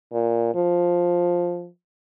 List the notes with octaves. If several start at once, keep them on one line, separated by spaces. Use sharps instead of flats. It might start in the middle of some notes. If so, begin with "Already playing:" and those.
A#2
F3